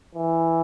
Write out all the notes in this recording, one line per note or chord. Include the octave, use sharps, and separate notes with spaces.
E3